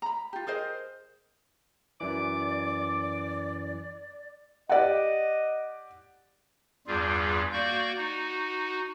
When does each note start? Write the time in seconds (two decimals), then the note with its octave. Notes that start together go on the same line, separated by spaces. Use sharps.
0.02 A#5 B5
0.33 F4 G4
0.47 G#4 A#4 C5 D#5
2.01 F#2 E3 D5 D6
4.69 G4 D5 D#5 F#5
6.87 E2 G2 G3 F4 G#4
7.53 A#3 F#4 D5 C#6 G6
7.97 D#4 F#4